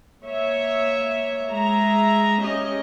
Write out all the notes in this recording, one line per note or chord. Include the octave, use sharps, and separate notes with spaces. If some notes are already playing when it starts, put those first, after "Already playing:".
A#3 C#5 E5
G#3 E5 A#5
C#4 G4 D#5